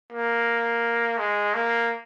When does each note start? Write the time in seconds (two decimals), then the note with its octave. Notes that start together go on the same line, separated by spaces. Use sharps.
0.12 A#3
1.18 G#3
1.54 A#3